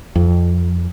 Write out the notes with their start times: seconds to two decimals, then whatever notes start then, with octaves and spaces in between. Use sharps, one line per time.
0.16 F2